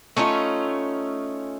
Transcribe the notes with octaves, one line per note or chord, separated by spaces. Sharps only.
A3 C#4 D#4 F4